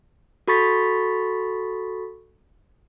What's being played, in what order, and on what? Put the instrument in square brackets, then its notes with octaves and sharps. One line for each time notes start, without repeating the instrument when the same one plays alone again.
[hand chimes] F#4 A4 B5 C#6 A6 B6